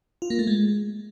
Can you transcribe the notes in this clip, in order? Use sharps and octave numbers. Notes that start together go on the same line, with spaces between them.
F4
A#3
A3
G#3